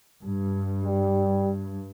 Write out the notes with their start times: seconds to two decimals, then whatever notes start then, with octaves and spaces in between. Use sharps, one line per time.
0.22 G2
0.85 G3